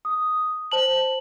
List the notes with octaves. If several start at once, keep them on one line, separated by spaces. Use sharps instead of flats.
D#6
C5 A5 F#7